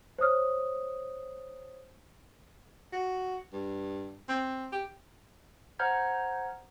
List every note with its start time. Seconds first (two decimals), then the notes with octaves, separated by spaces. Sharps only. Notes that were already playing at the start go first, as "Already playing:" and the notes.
0.19 C5 C#5 D#6 F6
2.93 F#4
3.53 G2
4.28 C4
4.72 G4
5.79 C5 F#5 A#5 F6 G6 G#6